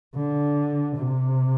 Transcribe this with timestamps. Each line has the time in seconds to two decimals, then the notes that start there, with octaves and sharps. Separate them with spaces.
0.15 D3
0.97 C3